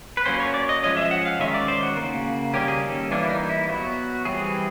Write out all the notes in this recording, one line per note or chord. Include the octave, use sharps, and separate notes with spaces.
B4
F#3 A#3 C#4 C5
C#5
D5
D#5
F3 G#3 C#4 D#5
E5
F#5
F5
D#3 G#3 C#4 E5
D5
C5
F#4
C#3 F3 A#3
D#3 G3 A#3 C#4 G4
G#4
A4
E3 G3 A#3 D4
E4
D#4
E4
F#3 B3 F#4
E3 G3 C4 G#4